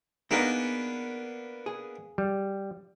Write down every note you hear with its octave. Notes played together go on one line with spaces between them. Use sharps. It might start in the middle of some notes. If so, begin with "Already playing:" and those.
A#3 B3 D4 D#4 G#4 A#4
G#4
G3